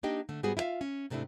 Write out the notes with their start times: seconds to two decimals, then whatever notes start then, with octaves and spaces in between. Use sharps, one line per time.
0.03 A#3 D4 D#4 G4 D#5 G5
0.29 D3 A3
0.43 G#2 G3 B3 F#4 G#4
0.57 E4 F4 G4 E5 F5
0.81 C#4
1.10 G#2 C3 A3 D4 E4